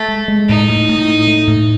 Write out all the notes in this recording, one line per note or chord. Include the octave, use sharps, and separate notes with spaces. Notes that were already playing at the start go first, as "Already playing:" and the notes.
Already playing: A3
G#3
G#3
A2 D#4
A2
A2
A3
A3
A2